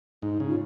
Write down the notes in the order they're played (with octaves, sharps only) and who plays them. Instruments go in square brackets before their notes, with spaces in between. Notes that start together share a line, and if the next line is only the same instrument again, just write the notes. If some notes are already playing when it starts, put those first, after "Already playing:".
[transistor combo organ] G#2 [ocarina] D#4
[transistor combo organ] C#3
[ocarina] F4